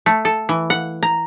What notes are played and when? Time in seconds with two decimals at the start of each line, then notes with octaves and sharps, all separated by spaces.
0.06 A3
0.25 A4
0.49 E3
0.70 F#5
1.03 A#5